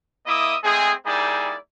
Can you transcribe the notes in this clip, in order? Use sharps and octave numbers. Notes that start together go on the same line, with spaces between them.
A#3 E4 D#5 E5 D6 D#6
G#3 A3 C4 G#4
G3 A#3 D#4 E4 G#4 D5